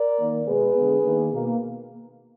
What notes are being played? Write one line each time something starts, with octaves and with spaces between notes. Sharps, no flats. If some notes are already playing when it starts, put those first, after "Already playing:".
Already playing: A#4 D5
D#3 A#3
B2 G#3 B3 G#4 B4
D3 G#3 B3
D#3 A#3
B2 A#3